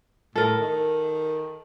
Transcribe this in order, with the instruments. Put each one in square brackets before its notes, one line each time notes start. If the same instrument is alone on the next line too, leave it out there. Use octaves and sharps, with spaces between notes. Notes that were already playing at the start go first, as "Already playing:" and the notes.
[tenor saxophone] A2 [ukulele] A4 A#4
[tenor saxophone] D#3